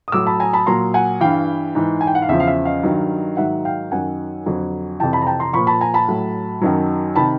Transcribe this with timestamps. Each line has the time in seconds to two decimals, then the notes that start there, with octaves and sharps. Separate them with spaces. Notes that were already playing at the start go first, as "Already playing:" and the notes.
0.08 D#6
0.12 A2 F#3 D6 E6
0.26 A5 B5
0.40 G#5 A#5
0.53 A5 B5
0.66 A#2 F#3 A#5 C6
0.94 F#5 G#5
1.20 G2 E3 F5 G5
1.75 G#2 E3
2.01 G#5
2.07 G5
2.15 F#5
2.22 F5
2.29 E2 C#3 F3 E5
2.40 F5
2.47 E5
2.65 D#5 F5
2.83 G2 D#3 F#3
3.37 G#2 D#3 F#3 E5 F#5
3.65 F5 G5
3.92 F#2 D#3 F#3 F#5 G#5
4.46 F2 D3 F#3
5.00 F2 C3 E3 G5 A5
5.13 A5 B5
5.22 A#5
5.27 G5 A5
5.40 A#5 C6
5.53 A#2 F3 B5 C#6
5.67 A5 B5
5.81 G#5 A#5
5.94 A5 B5
6.08 A2 F#3
6.61 F#2 D#3 F#3
7.16 C3 D#3 A5 B5